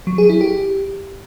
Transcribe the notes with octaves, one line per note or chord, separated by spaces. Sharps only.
F#3
G#4
E4
G4